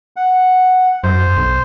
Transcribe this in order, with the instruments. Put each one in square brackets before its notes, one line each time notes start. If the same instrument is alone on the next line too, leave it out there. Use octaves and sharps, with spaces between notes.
[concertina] F#5
[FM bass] F#2 [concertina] C5
[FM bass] B1